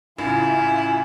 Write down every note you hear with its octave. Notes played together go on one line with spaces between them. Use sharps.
A1 C#3 E4 F4 E5 G#5